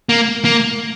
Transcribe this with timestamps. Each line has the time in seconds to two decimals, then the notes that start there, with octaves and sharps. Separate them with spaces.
0.09 A#3
0.45 A#3